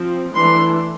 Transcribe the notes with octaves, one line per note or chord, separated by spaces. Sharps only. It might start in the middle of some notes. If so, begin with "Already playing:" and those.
Already playing: F3 C4
E3 A3 D4 C6